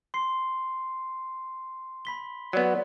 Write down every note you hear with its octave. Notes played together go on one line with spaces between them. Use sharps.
C6 C7
B5 B6 G7
F#3 B3 D5